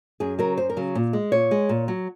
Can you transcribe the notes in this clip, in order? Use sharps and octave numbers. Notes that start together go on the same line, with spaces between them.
F#2 G#4
C#3 F#3 A#4
F#2 C5
A#4
C#3 F#3
A#2
G#3
A#2 C#5
G#3
A#2
F#3